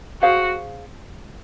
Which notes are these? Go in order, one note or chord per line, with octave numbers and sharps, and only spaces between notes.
F#4 G#4 C5 F5